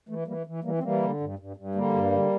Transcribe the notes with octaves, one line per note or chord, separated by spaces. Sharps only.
E3 A3
E3 G3 A#3
E3
E3 G3 A#3
C4
E3 G3 A#3
D3
G2
G2
G2
D3 G3 A#3
G2
D3